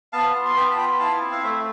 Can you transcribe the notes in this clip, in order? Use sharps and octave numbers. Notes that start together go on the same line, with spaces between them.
B3 F5 A5
F4
C6
B3 G5 B5
A5
F4 G5 B5
E4 F5 A5
C4
F5
A3 C5 E5